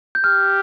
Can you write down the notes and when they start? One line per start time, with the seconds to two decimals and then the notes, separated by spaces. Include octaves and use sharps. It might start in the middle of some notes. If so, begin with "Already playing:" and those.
0.15 G6
0.24 G4 F6